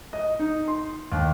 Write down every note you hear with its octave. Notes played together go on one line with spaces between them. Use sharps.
D#5
D#4
C6
D#2